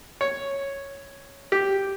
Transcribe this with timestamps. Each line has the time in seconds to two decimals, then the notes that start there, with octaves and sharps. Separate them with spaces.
0.21 C#5
1.52 G4